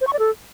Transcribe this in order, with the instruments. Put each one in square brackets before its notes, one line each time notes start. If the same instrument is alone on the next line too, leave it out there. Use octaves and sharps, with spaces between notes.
[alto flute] C5
C#6
D5
A4